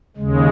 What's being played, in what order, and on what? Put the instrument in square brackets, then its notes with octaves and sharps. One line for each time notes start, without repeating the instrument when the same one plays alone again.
[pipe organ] D#2 C#3 G#3